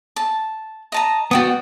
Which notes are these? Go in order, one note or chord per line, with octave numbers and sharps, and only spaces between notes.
A5
D#5 A5 A#5
B3 F#4 D5 G5 D#6